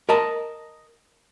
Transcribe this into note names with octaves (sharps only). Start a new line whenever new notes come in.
A#4 D#5 A5